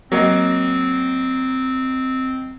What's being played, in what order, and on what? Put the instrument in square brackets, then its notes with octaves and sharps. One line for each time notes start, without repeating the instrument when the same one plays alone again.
[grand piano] F#3 A#3 D#5 [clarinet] C4